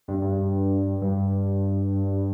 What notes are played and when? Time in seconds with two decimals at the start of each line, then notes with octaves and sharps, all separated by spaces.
0.08 G2
0.22 G2
1.01 G2